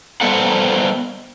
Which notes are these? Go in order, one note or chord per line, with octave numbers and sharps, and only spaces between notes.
G3 A3 B3 C4 A4 F#5